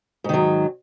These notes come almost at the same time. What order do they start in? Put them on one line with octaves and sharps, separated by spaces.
G#2 D#3 F#3